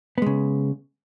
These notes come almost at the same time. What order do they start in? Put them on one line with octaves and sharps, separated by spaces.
B3 G#3 C#3